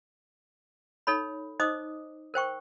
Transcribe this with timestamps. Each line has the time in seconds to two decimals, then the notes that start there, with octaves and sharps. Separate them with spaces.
1.07 D#4 A4 C#5 B5
1.60 D#4 C5 D#5 D6 D#6
2.34 A#4 C5 G5 C#6